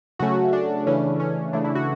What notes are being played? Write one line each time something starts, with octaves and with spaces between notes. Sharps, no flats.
C#3 F#3 A3 C#4 F#4
D4
C#3 E3 A3 C#4
C#4
C#3 E3 A3 D4
E4
F#4